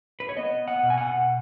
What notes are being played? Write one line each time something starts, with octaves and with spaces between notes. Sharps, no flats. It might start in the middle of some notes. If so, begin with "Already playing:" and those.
B4
C#5
B3 D#5
F#5
B2
G#5
F#5